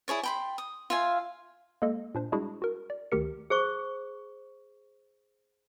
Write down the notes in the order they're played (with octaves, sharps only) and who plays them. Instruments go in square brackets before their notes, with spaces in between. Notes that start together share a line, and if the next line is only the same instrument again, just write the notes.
[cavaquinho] E4 G#4 C#5 D5
G5 B5 C6
D#6
F4 E5 F5 G#5
[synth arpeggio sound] G#3 A#3 A4 D#5
A#2 D4 C5
G3 G#3 D4 E4 F#4 G#4
F#4 A#4
D5
D2 D#3 G4 A#4 C#7
[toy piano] G#4 C5 C#6